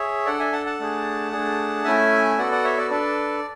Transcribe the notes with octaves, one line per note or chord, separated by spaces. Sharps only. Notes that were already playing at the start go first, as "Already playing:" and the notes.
Already playing: G#4 C#5 E5
D4 A4 D5 F#5
E5 G#5
F#5 A5
F#5 A5
A3 D4 G#4
A3 D4 G#4
A3 C#4 E4 E5 G#5
B3 F#4 A4 D5 F#5
D5 F#5
C#5 E5
B4 D5
D4 A4 B4 D5